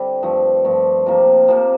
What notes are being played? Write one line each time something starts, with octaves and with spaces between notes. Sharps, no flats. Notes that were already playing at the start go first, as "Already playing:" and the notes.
Already playing: D3 G3 C4
G2 F3 A3
G2 F3 A3
C3 F3 A#3
C3 F3 A#3